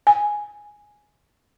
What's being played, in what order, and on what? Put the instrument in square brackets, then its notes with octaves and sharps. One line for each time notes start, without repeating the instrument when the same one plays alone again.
[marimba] G#5